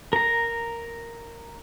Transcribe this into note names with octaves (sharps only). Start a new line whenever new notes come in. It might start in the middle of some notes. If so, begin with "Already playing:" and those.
A#4 A#5